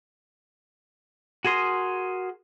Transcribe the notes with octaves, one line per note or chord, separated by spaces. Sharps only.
F#4 G#4 A#4 C6 D#6